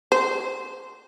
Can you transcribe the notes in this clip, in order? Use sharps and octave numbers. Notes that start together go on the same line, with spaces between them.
C5